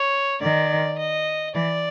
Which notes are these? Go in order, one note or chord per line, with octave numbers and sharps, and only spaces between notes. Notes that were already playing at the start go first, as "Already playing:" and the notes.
Already playing: C#5
D#3 D5
D#5
E3 D5